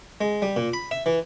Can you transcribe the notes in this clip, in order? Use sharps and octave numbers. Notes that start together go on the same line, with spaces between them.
G#3
G3
A#2
B5
E5
E3